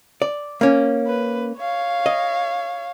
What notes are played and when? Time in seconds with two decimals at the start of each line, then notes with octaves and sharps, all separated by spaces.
0.22 D5
0.61 A#3 C#4
1.07 B4
1.58 C#5 F5
2.06 D#5